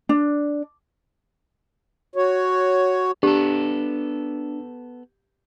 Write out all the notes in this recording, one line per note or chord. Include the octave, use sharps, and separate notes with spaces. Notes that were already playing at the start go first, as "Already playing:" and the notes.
D4
F#4 C#5
B3 D4 G4 A4